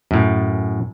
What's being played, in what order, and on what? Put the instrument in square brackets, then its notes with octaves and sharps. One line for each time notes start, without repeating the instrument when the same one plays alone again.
[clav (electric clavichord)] F#2 A2